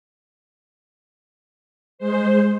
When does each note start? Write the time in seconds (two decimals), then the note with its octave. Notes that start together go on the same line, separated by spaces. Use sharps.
1.99 G#3 C5